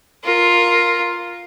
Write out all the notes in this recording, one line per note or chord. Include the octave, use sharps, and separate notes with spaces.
F4 A#4